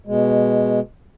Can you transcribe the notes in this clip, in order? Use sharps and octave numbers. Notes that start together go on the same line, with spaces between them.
B2 G#3